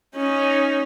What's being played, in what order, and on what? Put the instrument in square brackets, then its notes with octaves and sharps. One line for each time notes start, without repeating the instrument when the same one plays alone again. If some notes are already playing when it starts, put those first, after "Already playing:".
[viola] C#4 D#4